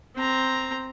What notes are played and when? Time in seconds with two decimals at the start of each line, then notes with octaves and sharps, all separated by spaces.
0.16 C4 A#5